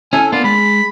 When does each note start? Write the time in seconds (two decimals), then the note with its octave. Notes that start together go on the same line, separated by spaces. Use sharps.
0.13 C#4 E4 A4 G#5
0.33 A#3 B3 D4 F4
0.44 G#3 B5